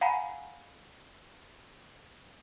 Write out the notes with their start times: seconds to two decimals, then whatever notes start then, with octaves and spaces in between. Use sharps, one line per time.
0.01 F5 F#5 G#5 A#5 B5